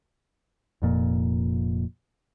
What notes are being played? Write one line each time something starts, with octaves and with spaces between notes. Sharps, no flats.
F1 F2 A#2